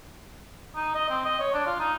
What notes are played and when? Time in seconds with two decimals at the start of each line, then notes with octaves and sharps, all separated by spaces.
0.76 D#4
0.95 D#5
1.10 C4
1.25 D#5
1.39 C#5
1.54 D4
1.66 F4
1.79 D#4